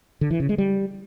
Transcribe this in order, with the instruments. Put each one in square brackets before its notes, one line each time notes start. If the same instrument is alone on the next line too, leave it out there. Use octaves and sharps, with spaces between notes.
[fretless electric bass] D3
E3
C#3
G#3
G3